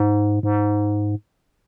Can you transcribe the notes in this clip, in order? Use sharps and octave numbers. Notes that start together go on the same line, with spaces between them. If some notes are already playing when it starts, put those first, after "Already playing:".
Already playing: G#2
G#2